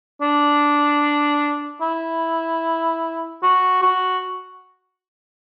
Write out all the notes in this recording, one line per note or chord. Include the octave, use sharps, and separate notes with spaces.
D4
E4
F#4
F#4